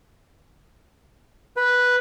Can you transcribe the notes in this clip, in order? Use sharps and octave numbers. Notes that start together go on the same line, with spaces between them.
B4